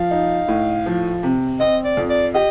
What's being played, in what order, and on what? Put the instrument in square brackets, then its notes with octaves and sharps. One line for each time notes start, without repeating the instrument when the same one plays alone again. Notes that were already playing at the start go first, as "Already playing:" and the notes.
Already playing: [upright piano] F3 [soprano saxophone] F5
[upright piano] D#4
A2
F3
C3
[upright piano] C4 [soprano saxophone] D#5
[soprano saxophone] D5
[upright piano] F2
[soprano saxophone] D5
[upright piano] G4 [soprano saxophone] D#5